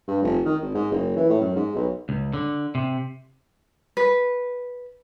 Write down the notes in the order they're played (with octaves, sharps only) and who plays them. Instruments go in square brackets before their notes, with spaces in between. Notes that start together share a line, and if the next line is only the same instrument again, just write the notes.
[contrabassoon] G2
F1
D#3
G#1
G#2
F#1
E3
A2
F#2
G#2
B1
[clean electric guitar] C#2
D3
C3
[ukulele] B4